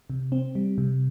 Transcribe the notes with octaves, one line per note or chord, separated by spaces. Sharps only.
C3
C4
G3
C3